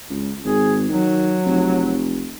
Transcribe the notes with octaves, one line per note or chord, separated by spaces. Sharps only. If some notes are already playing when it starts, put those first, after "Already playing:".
C#2
G#1 G#4
D#3 F#3
F1